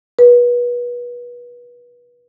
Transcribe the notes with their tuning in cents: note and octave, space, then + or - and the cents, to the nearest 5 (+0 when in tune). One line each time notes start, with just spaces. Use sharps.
B4 -30